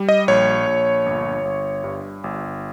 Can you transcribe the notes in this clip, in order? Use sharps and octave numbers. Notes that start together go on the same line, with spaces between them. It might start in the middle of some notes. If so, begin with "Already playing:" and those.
Already playing: G3
D#5
A#1 C#5
A#1
G1
G1
G2
G1